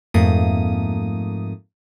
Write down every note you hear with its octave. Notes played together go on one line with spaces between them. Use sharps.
F2 G#2 A3 A#3 D#6